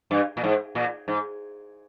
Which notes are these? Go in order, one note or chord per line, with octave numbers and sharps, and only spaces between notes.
G2
A#2
G#2
A#2
G#2